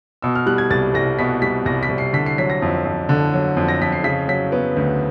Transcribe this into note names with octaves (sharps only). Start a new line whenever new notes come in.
B2 E6
F6
G3 F#6
G#6
C2 A6
C2 A#6
B2 B6
G3 B6
C2 A#6
B6
C2
C7
D3 B6
C7
F#3 B6
A#6
F2
F2
D3
F#3
F2
A#6
F2 B6
C7
C#3 B6
F#3 B6
B3
D2